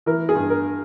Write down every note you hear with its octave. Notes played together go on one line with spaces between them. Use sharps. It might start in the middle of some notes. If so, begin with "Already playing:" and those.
E3 A#4
G#4
G2
A#4